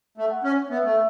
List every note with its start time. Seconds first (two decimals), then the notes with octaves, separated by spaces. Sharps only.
0.18 A3
0.31 F#5
0.44 C#4
0.70 B3 E5
0.85 A3